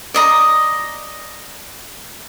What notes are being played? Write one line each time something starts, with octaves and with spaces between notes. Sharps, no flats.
D5 D#5 A#5